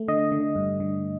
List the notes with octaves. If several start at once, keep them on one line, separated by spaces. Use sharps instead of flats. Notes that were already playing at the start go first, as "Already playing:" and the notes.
Already playing: A3
D3 D#5
D3
G2
D3